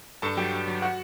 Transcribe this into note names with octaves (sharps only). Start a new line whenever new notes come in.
G2 A4 A5
F#3 G4 G5
G2
F#3
F#4 F#5